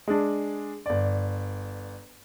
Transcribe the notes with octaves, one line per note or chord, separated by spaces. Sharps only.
G#3 D4
G1 D5